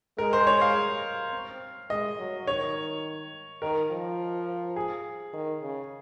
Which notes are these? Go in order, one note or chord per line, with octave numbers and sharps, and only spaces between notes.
G#3 A#4
C5
C#5
F5
C4
G#3 D#5
F#3
D#3 C#5
D#3 A#4
F3
G#4
D#3
C#3